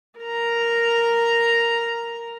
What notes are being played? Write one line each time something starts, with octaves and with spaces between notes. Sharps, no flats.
A#4 A#5